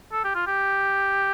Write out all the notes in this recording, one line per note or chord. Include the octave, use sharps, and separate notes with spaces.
A4
G4
F4
G4